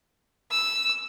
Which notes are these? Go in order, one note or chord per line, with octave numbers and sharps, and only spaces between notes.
E6